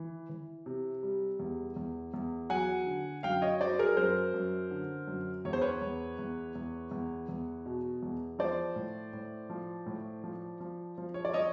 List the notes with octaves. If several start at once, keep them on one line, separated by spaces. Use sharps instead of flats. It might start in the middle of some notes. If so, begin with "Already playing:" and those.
Already playing: E3
E3
C3
G3
E2
E2
E2
F#3 F#5 G#5
D3
F#2 F5 G5
C#5 D#5
F#3 C5 D5
G#4 A#4
F#2 A#4 C5
F#2
D3
F#2
E2 C#5
C5
B4 C#5
E2
E2
E2
E2
E2
B2
E2
F3 C5 D5
A2
A2
F3
A2
F3
F3
F3
C#5
D5
F3 C#5 D#5